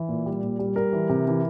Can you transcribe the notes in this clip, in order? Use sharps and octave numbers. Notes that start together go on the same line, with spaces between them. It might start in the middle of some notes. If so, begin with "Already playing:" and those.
Already playing: E3
A#2
G3
A#2
G3
G3 A#4
E3
C3
E3